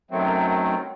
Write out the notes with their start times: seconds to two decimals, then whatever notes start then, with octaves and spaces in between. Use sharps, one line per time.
0.11 F#2 D#3 F#3 A3 C4